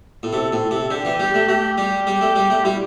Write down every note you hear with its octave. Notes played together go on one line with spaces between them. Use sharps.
A2
C3 A4
A2
C3
D3 G4
E3
G3
A3
A3 G4
G3
G3
A3
G3
A3
G3 E4